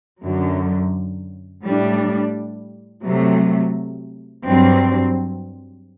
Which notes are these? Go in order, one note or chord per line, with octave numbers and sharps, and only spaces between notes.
F#2 D3 F#3
A2 G3 D4
C3 F#3 A3
G2 F#3 C4